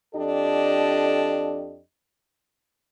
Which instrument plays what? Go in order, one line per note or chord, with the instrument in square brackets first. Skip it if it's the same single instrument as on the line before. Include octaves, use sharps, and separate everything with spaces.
[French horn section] F2 D4 G4 A4 D5 D#5